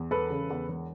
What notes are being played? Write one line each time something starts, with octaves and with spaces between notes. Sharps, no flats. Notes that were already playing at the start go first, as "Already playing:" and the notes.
Already playing: E2
E1 A4 B4
C#3
E2
E1